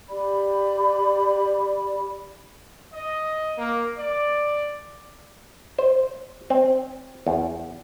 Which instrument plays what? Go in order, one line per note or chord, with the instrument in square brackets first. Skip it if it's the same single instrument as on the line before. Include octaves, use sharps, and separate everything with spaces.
[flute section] G4 D5 B5
[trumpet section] D#5
A#3
D5
[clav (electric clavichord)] C5
C4
E2